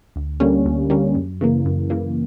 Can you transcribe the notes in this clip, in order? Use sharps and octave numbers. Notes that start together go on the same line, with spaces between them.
D2
D3 G3 A#3 C#4
D2
D3 G3 A#3 C#4
F#2
C#3 E3 A#3
F#2
C#3 E3 A#3